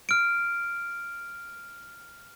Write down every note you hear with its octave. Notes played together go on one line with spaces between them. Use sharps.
F6 D7